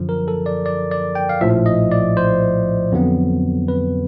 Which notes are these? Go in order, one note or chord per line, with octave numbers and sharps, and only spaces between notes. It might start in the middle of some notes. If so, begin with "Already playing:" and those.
Already playing: F#2 D3 F3
A#4
A4
D5
D5
D5
G5
F5
A#1 A2 F3 E5
D#5
D5
C5
F2 D3 F#3 B3
B4